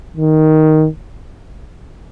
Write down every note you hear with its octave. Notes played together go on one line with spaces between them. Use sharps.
D#3